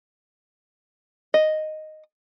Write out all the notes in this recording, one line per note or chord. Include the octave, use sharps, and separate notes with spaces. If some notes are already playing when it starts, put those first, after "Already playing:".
D#5